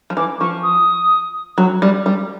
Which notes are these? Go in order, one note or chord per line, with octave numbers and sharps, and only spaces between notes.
F3
E3 D6
F3 C#6
D#6
F#3
G3
G3